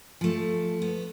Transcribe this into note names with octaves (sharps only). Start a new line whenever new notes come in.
F3 A3
B3